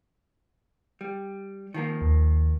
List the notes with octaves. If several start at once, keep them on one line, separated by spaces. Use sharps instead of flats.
G3
D#3 F3 A#3
D#2